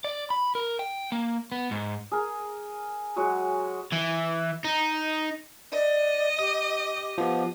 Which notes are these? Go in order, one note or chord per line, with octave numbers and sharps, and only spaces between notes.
D5
B5
A#4
G5
A#3
B3
G#2
G#4 A#4
F#3 G#3 F#4
E3
D#4
D5 D#5
G4 D#6
F3 B3